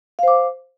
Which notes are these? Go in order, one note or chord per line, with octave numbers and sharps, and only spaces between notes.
C5 F5 D6